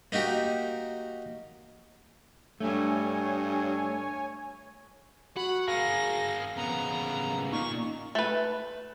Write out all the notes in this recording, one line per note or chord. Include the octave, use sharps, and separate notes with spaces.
A#3 D#4 F#4 G4
G2 A3 C#5 G#5
F#4 F#5 B5
G#4 A#4 F5 A#6
C#3 B3 A#5
A#2 D#4 C#6
A3 B4